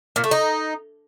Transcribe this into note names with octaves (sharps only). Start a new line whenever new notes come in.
A#2
A3
D#4